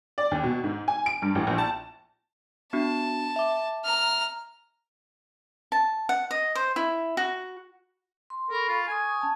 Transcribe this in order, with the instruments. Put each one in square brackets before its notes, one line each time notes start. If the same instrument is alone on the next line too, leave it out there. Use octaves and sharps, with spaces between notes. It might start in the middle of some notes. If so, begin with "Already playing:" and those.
[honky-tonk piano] D5
D#2
B2
G#2
G#5
D7
G2
A1
A#1
A5
[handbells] B3 D4 F#4 [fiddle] A5
[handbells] E5 D6
[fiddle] A#5 F6
[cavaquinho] A5
F#5
D#5
C5
E4
F#4
[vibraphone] C6
[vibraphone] A4 B5 C#6 [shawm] A#4
[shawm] F4
[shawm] G#5 [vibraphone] C#6 D#6
[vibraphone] C#4 A5